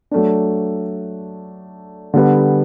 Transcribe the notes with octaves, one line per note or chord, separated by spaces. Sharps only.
F#3 A3 D4
D3 G3 B3